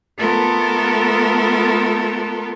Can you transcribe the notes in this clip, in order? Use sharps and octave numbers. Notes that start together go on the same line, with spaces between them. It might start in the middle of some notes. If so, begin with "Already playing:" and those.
A3 B3 F4 A4 A#4